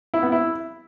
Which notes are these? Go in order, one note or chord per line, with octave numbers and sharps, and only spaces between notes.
E4
B3
E4